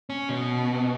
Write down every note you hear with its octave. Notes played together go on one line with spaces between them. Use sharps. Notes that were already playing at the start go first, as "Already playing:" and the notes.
C#4
B2